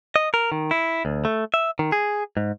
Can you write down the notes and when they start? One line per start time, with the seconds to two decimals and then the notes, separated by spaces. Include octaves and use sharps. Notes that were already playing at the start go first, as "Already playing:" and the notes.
0.16 D#5
0.34 A#4
0.52 D#3
0.71 E4
1.05 D2
1.25 A3
1.54 E5
1.79 D#3
1.92 G#4
2.37 G#2